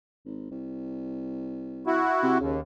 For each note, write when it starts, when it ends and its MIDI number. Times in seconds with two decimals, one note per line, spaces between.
0.25 0.50 32
0.51 2.06 36
1.87 2.38 64
1.87 2.38 66
2.23 2.35 48
2.40 2.61 39
2.40 2.56 49